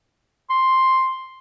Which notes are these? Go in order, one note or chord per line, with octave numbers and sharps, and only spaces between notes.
C6